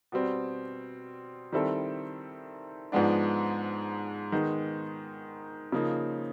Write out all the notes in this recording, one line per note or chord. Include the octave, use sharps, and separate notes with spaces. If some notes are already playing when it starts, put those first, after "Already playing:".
B2 G3 C4
D#3 G3 C4 E4 A4
G#2 F3 G#3 B3 D4
D#3 G#3 B3 D#4
C#3 F3 A#3 D#4